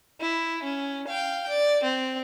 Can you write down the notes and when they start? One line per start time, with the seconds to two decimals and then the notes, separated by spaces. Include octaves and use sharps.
0.21 E4
0.63 C#4
1.08 F5 G5
1.49 D5
1.83 C4